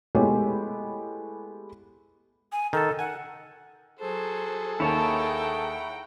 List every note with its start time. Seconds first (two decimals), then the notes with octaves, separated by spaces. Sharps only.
0.15 G#3 A3 B3 E4 G4 C#5
2.52 G#5
2.73 D#3 A4 A5
2.99 F#5 G#5
3.99 F#3 G#4 A4 C5
4.80 D#2 A#3 E4 C#5 F#5 G5 A5 A#5